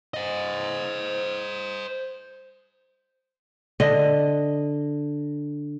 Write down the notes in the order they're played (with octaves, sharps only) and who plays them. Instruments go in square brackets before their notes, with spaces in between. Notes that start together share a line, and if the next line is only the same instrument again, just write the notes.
[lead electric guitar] C5 D#5
[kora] D3 D#5